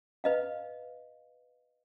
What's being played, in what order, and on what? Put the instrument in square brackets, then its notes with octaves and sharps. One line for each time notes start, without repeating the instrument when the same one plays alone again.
[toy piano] B4 D#5 F5